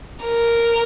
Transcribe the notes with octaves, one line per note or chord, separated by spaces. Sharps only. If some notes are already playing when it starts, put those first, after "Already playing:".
A#4